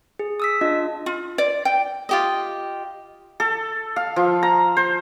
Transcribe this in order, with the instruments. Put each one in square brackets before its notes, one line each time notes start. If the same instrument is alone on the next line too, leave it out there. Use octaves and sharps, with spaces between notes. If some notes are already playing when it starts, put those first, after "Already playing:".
[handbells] G#4
D#6 E6 B6
D4 F4 D#5
[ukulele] F4
D5
G5
[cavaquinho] F4 G4 D#5
[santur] A4
F5
F3
A#5
C5